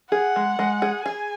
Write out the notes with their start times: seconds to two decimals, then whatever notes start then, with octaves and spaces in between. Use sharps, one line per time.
0.12 G#4 F#5
0.36 G#3
0.59 G#3
0.82 G#4
1.05 G#4 G#5